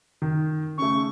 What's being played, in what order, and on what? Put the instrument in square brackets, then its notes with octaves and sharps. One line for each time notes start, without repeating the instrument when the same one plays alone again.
[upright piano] D#3
[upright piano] C#3 A3 [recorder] C#6